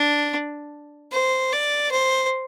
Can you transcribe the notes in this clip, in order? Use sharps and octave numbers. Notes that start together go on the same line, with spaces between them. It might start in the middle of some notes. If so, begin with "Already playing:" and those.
Already playing: D4
C5
D5
C5